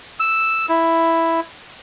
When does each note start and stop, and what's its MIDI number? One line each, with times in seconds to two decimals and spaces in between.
0.20 0.66 88
0.69 1.40 64